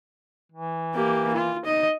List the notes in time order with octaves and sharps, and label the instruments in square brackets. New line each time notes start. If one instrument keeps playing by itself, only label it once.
[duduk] E3
[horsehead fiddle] A#3 G4
F4
[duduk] D#4 [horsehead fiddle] D#5